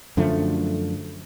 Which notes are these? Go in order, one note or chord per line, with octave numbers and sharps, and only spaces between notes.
F#2 D3 F3 A3